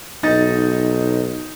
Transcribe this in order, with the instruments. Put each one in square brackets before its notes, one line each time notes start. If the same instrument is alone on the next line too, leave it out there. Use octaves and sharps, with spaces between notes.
[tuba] B1 [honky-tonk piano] D#4 A6